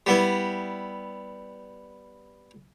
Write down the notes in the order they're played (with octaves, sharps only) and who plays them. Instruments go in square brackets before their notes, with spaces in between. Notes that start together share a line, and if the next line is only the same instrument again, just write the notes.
[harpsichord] G3 B3 E4